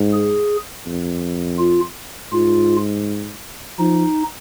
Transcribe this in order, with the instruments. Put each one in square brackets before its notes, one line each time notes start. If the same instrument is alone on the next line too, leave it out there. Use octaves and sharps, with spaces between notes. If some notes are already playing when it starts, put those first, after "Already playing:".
Already playing: [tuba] G#2
[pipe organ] G#4
[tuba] F2
[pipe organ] F4
[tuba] G#2 [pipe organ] F4
[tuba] F3 [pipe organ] D#4